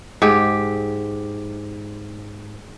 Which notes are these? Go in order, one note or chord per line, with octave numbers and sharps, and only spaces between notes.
G#2 G4